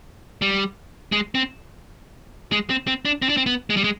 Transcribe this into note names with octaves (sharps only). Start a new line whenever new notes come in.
G3
G#3
C4
G#3
C4
C4
D4
C4
D4
C4
B3
G#3
G3
G#3